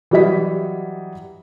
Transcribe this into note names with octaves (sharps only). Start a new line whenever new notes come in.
E3 F#3 G3 D#5 B6